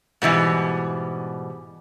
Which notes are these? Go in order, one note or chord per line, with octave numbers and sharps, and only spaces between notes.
G#2 B2 E3 G3